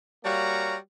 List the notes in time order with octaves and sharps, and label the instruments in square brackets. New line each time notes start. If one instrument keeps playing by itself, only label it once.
[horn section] G3 A#3 F#4 C#5 F5 A#5